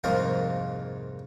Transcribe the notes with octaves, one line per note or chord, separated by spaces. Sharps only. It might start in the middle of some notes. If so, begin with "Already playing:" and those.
C2 F2 G#2 A#3 F5